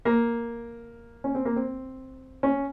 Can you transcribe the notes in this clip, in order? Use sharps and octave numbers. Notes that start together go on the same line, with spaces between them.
A#3
C#4
C4
A#3
C4
C#4